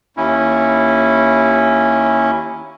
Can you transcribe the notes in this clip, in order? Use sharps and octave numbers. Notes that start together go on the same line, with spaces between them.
D#2 C#4 E4